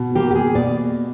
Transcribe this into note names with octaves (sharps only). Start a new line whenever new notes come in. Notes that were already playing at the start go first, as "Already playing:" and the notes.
Already playing: B2
A#3 G4
G4
G#4
B2 D5